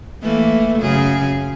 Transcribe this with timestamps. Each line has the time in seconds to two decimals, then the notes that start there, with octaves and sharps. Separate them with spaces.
0.23 E3 A3 A#3
0.79 F#2 C#3 G#4